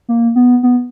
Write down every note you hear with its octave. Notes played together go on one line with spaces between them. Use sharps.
A#3
B3
B3